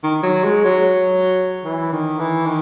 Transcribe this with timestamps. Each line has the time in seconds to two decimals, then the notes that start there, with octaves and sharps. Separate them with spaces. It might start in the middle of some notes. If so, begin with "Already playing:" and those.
0.03 D#3
0.23 F#3
0.44 G#3
0.64 F#3
1.64 E3
1.92 D#3
2.19 E3
2.46 D#3